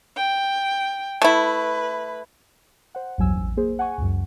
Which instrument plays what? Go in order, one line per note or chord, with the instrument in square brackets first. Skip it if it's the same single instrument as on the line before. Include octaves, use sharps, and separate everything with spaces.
[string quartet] G5
[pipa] A3 E4 [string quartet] B4
[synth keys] C5 F#5
A#1 E2 G2 F#3 G#5 E6
A1
A#3 G#4 C5
F#5 G#5 C#6
C#2 F#2